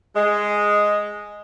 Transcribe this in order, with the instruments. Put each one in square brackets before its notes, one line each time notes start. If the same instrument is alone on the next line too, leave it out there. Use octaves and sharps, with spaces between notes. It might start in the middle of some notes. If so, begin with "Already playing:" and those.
[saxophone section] G#3